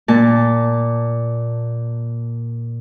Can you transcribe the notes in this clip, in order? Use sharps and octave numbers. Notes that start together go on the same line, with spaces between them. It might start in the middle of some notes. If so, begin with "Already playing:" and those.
A#2 A5